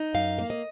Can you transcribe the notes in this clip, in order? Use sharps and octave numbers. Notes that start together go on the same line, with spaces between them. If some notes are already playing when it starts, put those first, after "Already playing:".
Already playing: D#4
F#2 F5
A#3
D#5